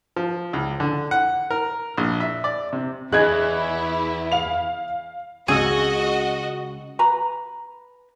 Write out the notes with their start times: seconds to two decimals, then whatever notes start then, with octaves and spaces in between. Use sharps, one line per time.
0.16 F3
0.53 C#2
0.80 D3
1.11 F#5
1.50 A#4
1.97 A#1
2.20 E5
2.44 D5
2.73 C3
3.12 E2 E4 G#4 D#5 F#6 G#6
4.32 F5 F7
5.48 C#2 F#4 G#4 D#5 E6
6.99 B4 A#5 B5